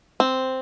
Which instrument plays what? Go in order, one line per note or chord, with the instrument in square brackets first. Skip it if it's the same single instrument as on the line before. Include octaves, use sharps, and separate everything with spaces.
[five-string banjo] C4